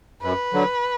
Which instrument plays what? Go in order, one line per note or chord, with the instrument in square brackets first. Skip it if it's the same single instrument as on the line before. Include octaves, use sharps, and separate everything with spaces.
[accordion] F#2 [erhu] B4
[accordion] D3 F#3